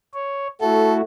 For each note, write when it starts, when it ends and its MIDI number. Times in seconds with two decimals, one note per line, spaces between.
0.14 0.47 73
0.61 1.01 57
0.61 1.01 64
0.61 1.01 66
0.61 0.94 69